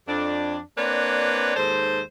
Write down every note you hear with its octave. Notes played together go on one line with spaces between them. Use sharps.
F2 D4
A#3 C4 D4 B4 C#5 D5
D#2 G#2 A4 C5